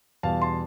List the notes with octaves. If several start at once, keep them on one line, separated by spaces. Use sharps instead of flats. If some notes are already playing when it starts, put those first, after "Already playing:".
E2 B2 G3 F5 A5
A5 C6